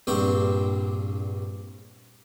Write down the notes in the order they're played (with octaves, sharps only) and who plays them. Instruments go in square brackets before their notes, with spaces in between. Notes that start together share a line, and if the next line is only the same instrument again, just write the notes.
[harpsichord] A#1 G2 C4 G4 C#6